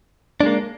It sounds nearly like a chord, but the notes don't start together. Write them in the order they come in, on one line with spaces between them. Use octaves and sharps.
D4 G#3 A#3